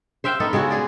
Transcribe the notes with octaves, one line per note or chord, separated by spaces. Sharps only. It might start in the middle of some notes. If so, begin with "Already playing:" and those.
C5 E5 F5 G5
B3 D#4 A4
C#3 G#3 C#4 F#4
G#4 D5